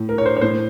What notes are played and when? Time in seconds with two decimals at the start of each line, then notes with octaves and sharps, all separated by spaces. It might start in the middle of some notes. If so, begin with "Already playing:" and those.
Already playing: A2
0.09 A#4
0.18 C#5
0.26 C5
0.37 C#5
0.41 A2 C5